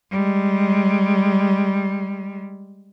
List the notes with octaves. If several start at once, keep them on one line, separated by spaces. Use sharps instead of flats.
G3 G#3